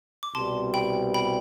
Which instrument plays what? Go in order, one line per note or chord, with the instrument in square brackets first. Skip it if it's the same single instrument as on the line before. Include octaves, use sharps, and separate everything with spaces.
[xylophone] D6
[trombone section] C2 B2 G3 [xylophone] A5 C6
[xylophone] G5 B5
G5 B5